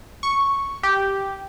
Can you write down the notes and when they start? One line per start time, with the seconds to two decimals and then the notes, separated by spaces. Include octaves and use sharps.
0.23 C#6
0.83 G4